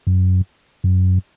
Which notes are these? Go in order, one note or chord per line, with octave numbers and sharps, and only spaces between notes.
F#2
F#2